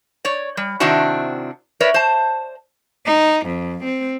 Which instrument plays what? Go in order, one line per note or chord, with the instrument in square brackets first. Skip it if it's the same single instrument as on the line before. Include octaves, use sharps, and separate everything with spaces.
[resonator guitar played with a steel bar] C#5 D5
G3
C3 D#3 C4 D4 E4 F#4
A#4 B4 C#5 D5 E5
C5 A5
[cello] D#4
F2
C4